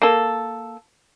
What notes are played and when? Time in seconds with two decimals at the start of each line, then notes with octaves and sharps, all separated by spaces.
0.02 A#3 A4